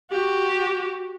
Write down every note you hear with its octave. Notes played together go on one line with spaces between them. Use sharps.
F#4 G4